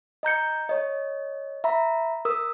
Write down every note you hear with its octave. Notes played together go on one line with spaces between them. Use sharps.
D#5 A#5 G6 C#7
C#5 D#5
E5 A#5 B5
A#4 D#6 E6